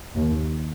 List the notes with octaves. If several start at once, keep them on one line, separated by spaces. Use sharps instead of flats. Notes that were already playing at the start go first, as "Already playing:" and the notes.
D#2